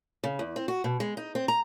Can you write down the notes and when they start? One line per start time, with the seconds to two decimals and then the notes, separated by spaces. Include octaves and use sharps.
0.24 C#3
0.39 E2
0.56 C4
0.68 F#4
0.84 B2
1.00 G#3
1.17 D#4
1.35 C4
1.48 A#5